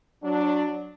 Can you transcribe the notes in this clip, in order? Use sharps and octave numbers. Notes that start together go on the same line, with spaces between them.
F#3 D4